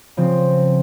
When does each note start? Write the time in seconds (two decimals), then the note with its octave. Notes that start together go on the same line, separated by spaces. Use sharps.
0.17 C#3 F3 C4